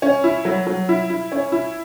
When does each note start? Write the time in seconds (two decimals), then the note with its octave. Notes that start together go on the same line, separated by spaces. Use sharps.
0.02 C#4
0.24 E4
0.45 F#3
0.67 F#3
0.89 E4
1.10 E4
1.32 C#4
1.52 E4